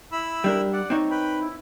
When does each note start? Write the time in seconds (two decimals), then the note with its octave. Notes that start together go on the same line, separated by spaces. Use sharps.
0.12 E4 B5 E6
0.44 G3 D4 A#4
0.73 D5 F#5
0.90 C4 D#4 C#5
1.11 B4 G5 B5
1.40 E4